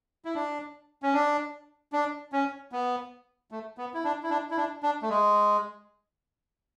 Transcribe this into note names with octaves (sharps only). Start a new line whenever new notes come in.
E4
D4
C#4
D4
D4
C#4
B3
A3
B3
E4
D4
E4
D4
E4
D4
D4
A3
G#3